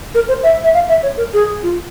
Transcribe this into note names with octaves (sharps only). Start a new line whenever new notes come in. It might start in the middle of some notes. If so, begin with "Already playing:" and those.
A#4
C5
E5
E5
F5
E5
C#5
A#4
G#4
F4